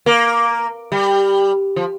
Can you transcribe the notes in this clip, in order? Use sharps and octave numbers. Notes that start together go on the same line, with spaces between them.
A#3
G3
F3